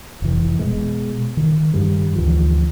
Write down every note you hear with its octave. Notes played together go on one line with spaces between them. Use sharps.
F1 E3
B2 G#3
D#3
G2 D#3 G3
D2 E3 F3